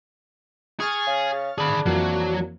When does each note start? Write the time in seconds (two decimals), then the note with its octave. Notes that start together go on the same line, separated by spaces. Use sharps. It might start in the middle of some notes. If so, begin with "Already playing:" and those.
0.80 G#4 C#6 F6 A6
1.07 C#3
1.58 D4 G#4 B5
1.86 F2 E3 F#3 A#3